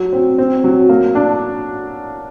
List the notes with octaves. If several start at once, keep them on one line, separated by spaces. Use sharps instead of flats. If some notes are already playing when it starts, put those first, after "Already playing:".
Already playing: F#3
C4
C4
F#3
A#3
D4